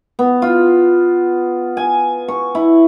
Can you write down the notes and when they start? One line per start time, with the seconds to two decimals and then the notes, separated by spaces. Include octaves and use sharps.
0.19 B3
0.42 F4
1.77 G#5
2.28 C#6
2.55 E4